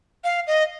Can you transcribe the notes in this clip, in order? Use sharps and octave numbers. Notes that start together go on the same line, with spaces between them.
F5
D#5